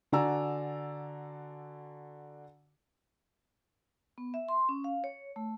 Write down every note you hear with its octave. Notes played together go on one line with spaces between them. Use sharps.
D3 F#4 D5 G#5 A#5 E6
B3
E5
C6
C#4
F5
C#5
A3